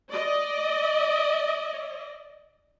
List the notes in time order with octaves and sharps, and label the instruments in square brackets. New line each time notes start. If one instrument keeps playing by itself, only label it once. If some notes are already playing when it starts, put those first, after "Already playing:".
[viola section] D5 D#5